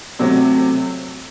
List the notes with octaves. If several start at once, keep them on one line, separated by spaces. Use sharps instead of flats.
C3 F#3 A3 C4